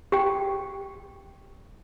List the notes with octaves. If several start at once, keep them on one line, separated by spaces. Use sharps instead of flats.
G4 G5